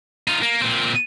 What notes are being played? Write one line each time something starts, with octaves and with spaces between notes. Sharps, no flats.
D#4 F4
A#3
A#2 C4